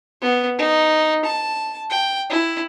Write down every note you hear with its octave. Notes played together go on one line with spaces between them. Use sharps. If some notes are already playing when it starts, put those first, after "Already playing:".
B3
D#4
A5
G5
E4